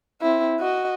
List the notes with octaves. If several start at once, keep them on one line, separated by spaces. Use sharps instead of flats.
C4 E4
F#4 D#5